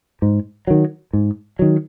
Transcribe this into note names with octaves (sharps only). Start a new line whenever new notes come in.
G#2
D#3 F#3
G#2
D#3 F#3